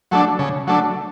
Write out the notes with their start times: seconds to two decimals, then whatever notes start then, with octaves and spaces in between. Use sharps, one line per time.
0.11 F#3 A3 D4
0.39 C#3
0.67 F#3 A3 D4